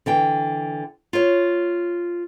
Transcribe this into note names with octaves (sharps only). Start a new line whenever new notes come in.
D3 E3 G5
F4 C#5